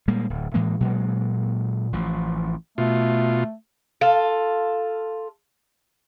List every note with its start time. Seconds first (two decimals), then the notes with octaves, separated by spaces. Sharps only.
0.08 A#2 G3 G#3 A#3
0.30 D1
0.54 A2 E3 G#3 A#3
0.80 A#2 F#3 G#3 A#3
1.93 A1 E3 F3
2.78 B2 A3 F4
4.01 F4 A4